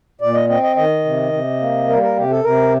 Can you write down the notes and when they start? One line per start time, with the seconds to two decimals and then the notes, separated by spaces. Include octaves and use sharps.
0.21 A#2 D5
0.35 D#5
0.49 C4 D#5
0.63 D#5
0.76 D#3 D#5
1.05 C3
1.33 C3
1.60 A#3
1.88 G3 A#4
2.02 A#4
2.16 C3 G4
2.31 A4
2.44 C3 A#4